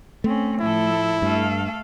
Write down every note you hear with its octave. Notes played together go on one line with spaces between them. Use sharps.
A3 C4 C#4
A2 F3 E4 A4
G2 A3 A4 F5